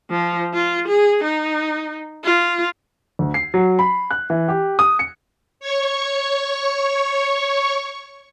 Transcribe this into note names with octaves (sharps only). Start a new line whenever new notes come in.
F3
F4
G#4
D#4
F4
D2
C7
F#3
B5
F#6
E3
G4
D#6
C#7
C#5 C#6